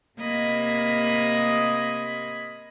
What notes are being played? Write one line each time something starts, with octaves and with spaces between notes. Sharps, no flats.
C3 A#3 D#5 B5 G#6